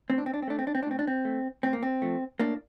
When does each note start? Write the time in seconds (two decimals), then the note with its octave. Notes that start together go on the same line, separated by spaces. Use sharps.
0.10 A2 C4
0.18 D4
0.26 C4
0.34 D4
0.42 C4
0.48 A3 D4
0.59 C4
0.67 D4
0.75 C4
0.83 D4
0.86 A2 C4
0.99 D4
1.07 C4
1.25 A3
1.63 A2 C4
1.73 A#3
1.83 C4
2.02 F3 A3
2.39 A2 A#3 D4